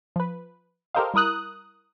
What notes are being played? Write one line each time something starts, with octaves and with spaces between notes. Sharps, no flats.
F3 B4
G4 A4 A#4 C5 D#5 F5
G3 E4 A#4 D#6 F#6